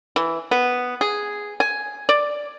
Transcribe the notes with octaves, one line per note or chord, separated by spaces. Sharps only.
E3
B3
G#4
G#5
D5